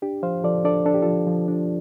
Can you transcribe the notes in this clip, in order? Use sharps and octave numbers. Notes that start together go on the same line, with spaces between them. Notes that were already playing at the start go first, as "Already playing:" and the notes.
D4 G4
F3 C5 F5
F3 A4 D5
D4 A4 D5
D4 A4
G4
F3 F4 A4
F3
D4